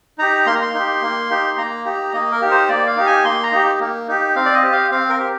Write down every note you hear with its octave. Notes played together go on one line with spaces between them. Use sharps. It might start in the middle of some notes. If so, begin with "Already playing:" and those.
D#4 G4 A#5
A#3 C6
A#5
C6
D#4
G4
A#3
D#4 G4
A#3 A#5
D#4 G4
A#3 D#5
A#4
D#4 G4
C5
A#3 D5
F5
D#4 G4
G#5
A#3 C6
A#5
D#4 G4
A#3
D#4 G4
C4 F5
D5
D#5
G4
F5
C4 F5
A#4
G4